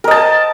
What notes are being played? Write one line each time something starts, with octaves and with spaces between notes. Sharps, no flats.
A#4 D#5 A5